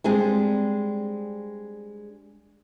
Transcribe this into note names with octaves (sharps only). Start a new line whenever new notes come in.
G3 G#3 C4 D4 G#4